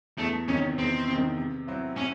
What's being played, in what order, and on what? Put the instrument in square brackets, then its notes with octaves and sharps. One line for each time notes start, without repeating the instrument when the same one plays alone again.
[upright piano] E2 [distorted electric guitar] A3
[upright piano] C3 D#3 [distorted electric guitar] C#4
[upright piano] E2 [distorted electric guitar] C4
[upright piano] C3
D#3
C3
F#3 C4 E4
[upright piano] C3 [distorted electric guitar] C#4